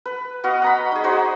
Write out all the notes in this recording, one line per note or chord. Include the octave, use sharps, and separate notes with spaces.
B4
B3 F#4 D#5 F5
F#5 A#5 B5
D#4 G#4
D#4 F#4 C5